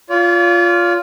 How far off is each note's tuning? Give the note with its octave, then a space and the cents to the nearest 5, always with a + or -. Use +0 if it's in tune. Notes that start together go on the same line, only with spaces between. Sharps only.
F4 +0 D5 -45